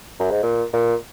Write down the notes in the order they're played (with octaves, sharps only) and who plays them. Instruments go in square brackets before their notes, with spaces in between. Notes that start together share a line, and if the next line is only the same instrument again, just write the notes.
[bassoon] F#2
G#2
A#2
A#2